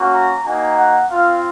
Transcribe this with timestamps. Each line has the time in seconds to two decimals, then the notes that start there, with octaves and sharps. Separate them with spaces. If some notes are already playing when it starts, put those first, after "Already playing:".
Already playing: A#3 C#4 F#4
0.14 A#5
0.46 A#3 D#4 F#4 G#5
0.77 F#5
1.09 C4 F4 F5